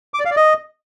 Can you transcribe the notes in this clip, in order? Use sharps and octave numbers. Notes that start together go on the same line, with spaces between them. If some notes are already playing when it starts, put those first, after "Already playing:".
D6
D5
F5
D5
D#5